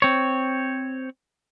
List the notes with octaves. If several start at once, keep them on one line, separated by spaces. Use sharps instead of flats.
C4 C#5